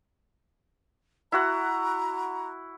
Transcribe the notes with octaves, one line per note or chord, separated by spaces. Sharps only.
E4 F#4 F#5 A#5